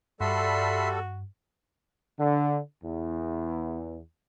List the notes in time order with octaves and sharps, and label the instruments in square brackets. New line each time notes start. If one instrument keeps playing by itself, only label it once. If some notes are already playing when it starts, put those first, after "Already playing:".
[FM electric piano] G2 [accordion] G3 A4 [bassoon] F#4 [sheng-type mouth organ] E5 B5 C6
[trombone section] D3
E2